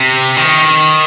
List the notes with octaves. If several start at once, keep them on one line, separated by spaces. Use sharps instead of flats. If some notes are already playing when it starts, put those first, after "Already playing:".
Already playing: C3
D#3